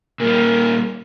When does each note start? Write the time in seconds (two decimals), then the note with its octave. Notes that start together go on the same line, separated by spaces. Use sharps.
0.20 A#2 G3 A#4